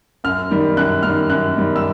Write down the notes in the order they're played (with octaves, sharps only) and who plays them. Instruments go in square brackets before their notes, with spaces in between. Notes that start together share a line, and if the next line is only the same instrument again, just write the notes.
[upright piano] F#2 F6
D#3 G3
F#2 F#6
D#3 G3 F6
F#2 F#6
D#3 G3
E6